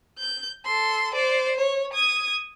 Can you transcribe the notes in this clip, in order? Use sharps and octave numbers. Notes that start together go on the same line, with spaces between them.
G6
A4 C6
C5 D5
C#5
D#6 G#6